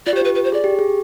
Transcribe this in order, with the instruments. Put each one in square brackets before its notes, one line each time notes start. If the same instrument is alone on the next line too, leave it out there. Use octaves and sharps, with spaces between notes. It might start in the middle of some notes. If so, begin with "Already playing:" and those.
[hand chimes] F4 [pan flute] D5
[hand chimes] G4
[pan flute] C5
[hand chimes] F4 [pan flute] B4
[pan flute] B4
C5
[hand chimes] G#4 [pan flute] D5
[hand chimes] G4
G#4